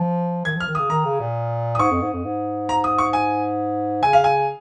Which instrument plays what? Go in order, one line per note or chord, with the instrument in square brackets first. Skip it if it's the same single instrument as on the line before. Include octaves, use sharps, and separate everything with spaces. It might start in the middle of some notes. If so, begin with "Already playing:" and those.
Already playing: [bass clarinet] F3
[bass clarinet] D#3 [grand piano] G#6
[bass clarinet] F3 [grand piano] F6
[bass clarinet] D#3
[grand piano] D#6
[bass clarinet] C#3
[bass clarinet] D#3 [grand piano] A#5
[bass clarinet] C#3
A#2
[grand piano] D#6
[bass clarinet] G#2 [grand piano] C#6
[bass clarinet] F2
G#2
F2
G#2
[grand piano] A#5
D#6
C#6
G#5
[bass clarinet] C#3 [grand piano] G#5
[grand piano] F5
G#5